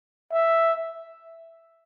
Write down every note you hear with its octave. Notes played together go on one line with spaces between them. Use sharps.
E5